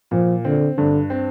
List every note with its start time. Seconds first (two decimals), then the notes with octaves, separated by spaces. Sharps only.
0.11 A#2 F3
0.45 D3 C4
0.77 G2 D3
1.10 C4